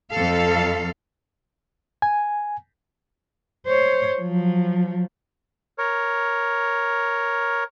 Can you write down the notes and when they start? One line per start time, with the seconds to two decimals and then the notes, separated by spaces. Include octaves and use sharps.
0.11 F2 A4 F5
2.02 G#5
3.66 C5 C#5
4.20 F3 F#3
5.78 A#4 C#5